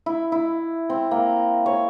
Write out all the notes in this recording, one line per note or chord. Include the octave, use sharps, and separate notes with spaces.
E4
E4
C4
A#3
C#5